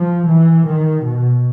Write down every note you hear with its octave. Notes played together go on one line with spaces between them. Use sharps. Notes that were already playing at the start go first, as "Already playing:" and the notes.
Already playing: F3
E3
D#3
B2